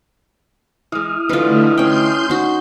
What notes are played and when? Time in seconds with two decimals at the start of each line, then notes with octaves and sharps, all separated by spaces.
0.92 E3 G#3 E4 D#6 F6
1.29 D3 E3 F#3 A3 D#4 F4 B4
1.78 C#4 G5 C6 G6
2.30 D#4 F#4